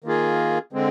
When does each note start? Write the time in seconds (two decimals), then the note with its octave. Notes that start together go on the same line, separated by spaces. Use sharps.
0.04 D#3 A#3 F4 G#4
0.73 D3 G#3 C4